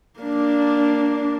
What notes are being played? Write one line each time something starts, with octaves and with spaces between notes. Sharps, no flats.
A#3 D4